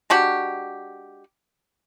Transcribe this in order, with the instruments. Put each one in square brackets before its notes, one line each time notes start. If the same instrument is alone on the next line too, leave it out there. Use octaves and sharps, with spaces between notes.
[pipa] G#3 D4 F#4 G4